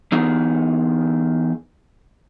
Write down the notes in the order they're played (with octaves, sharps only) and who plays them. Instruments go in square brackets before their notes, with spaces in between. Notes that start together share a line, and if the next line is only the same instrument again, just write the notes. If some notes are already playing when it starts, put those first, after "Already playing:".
[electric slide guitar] E3 B3 D#4 G#4